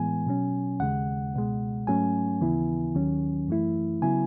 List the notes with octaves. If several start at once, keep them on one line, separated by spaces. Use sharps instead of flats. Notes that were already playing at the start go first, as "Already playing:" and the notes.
Already playing: A2 E3 G#3 B3 G#5
B2 F#3 C#4
D#2 C#3 G#3 F#5
C#2 B2 G#3
G#2 F#3 A3 C#4 G#5
D#2 C#3 E3 B3 E4
D#2 D#3 F#3 C#4
F#2 E3 A3 E4
C#3 F#3 B3 E4 G#5